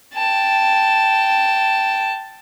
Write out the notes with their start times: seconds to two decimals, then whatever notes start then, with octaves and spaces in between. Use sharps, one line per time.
0.14 G5 A5